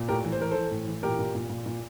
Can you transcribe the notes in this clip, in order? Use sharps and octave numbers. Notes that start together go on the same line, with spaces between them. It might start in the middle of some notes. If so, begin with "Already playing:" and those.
Already playing: A#2
A2 G4 A#4
E3
C5
E3 A#4
E3 A4 C5
A2
E3
A#2 G4 A#4
A#2
A#2
A#2
A#2